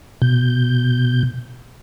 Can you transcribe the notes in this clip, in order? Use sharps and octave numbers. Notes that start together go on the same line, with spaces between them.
B2 G6